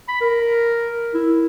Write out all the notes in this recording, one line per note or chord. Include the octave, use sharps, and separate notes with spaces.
B5
A#4
E4